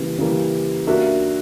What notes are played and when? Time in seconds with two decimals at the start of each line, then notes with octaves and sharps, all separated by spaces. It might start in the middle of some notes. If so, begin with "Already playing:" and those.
Already playing: C#3 E3 G3 A#3
0.19 C#3 E3 G3 A#3
0.87 A#3 D4 F#4 A#4 E5